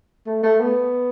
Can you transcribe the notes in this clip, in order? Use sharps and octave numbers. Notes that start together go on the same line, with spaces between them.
A3
A3
B3